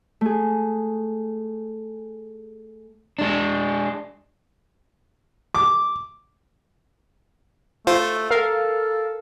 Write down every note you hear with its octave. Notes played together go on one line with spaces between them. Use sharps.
A3 G#4
G#3 D4
D6
A3 F4 C5
A4 A#4 F5